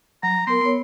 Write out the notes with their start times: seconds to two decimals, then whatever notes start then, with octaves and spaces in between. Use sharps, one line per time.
0.23 F#3 A#5
0.47 B3 A#4 C6
0.61 B3 C#5